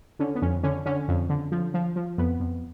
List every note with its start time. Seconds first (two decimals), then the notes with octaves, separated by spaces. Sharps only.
0.19 D3 C#4
0.35 B3
0.42 F2 C#4
0.63 D3 C#4
0.86 D3 C#4
1.08 F2
1.29 D3
1.52 F3
1.74 F3
1.96 F3
2.18 F2 B3
2.40 F2